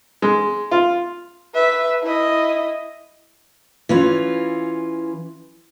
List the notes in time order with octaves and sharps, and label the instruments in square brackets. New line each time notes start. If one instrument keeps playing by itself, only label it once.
[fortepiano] G#3
F4
[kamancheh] B4 E5
E4 D#5
[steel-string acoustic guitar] E3 C#4 F4